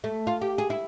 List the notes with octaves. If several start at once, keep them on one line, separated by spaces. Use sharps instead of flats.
A3
F4
G4
G#4
E4